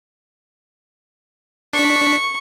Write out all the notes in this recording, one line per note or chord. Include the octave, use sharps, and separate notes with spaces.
D4 C#6 B6